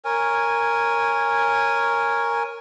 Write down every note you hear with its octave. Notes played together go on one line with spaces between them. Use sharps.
A#4 C#5 G#5